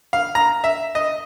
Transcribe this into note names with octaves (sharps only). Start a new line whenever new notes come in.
F5
A#5
E5
D#5